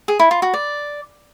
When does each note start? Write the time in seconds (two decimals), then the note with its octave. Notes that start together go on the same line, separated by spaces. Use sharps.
0.08 G#4
0.19 E4
0.31 F4
0.42 F#4
0.54 D5